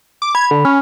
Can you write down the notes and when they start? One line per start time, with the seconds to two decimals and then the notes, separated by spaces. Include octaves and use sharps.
0.22 D6
0.35 B5 G#6
0.51 D3
0.65 C#4 F6